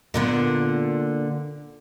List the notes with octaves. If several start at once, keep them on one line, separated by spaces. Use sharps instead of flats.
A#2 D3 B3